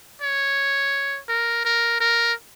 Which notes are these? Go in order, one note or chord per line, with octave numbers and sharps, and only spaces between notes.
C#5
A#4
A#4
A#4